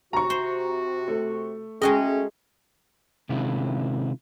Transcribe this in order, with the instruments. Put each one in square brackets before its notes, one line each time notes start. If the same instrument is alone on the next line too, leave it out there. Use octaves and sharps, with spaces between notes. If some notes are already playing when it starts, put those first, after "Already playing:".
[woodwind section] C3 F#4 [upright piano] A#5 C#6
[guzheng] C5
[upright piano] A3
[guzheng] G#3 F#4 D#5 [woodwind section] A3 C#4 [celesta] G#4 [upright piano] G5
[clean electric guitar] C3 D#3 G#3 C#4 E4 F4